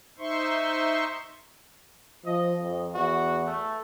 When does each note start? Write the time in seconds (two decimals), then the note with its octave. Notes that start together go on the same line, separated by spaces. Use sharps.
0.19 D#4 C5 E5 C6 C#6
2.26 F3 D#5
2.61 F2
2.94 E2 F#4
3.46 A3